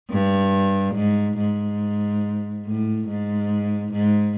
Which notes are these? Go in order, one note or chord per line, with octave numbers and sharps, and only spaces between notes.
G2
G#2
G#2
A2
G#2
G#2